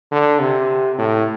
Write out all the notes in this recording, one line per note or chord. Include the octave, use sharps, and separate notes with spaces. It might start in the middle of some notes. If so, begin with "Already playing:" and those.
D3
C3
A2